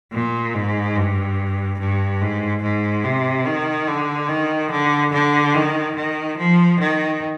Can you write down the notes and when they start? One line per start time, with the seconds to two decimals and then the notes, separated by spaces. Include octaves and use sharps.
0.13 A#2
0.55 G#2
0.96 G2
1.79 G2
2.21 G#2
2.63 G#2
3.04 C3
3.46 D#3
3.88 D3
4.29 D#3
4.71 D3
5.13 D3
5.55 D#3
5.96 D#3
6.38 F3
6.79 D#3